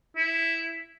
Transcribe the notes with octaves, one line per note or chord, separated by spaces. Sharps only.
E4